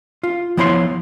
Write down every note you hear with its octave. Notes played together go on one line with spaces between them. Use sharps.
F4
F3 B3 E4 C#5 G#5 C6